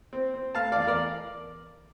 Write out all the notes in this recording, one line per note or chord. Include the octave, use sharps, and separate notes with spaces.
C4
C4
A3 F5 A5
E2 D5 F5
A#4 D5